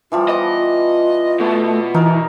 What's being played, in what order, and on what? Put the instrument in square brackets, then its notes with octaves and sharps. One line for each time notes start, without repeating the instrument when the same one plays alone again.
[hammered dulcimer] E3 F3 G3 [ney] F4
[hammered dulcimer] B3 D6 [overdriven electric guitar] D#5
[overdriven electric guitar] B2 [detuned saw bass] A3
[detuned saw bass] E3 [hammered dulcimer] D#4 A#4